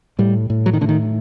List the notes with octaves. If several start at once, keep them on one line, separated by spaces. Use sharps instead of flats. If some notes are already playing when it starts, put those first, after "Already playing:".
A2 G3
A2
F#3
D#3
A2 D3
D#3